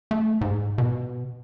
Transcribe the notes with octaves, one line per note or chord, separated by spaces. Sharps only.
A3
G#2
B2